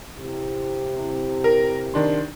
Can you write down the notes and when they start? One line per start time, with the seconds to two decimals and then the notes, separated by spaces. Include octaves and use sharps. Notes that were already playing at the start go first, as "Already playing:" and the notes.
0.19 C3 E4 G4
1.44 A#4
1.94 D#3 D4 C6